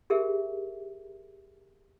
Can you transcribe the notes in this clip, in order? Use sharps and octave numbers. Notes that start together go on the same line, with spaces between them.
G4 G#4 A#4 E5